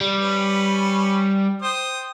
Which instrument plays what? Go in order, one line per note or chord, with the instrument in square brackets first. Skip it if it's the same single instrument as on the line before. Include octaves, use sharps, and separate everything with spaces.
[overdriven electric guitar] G3
[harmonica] C#4 B4
C5 G5 D#6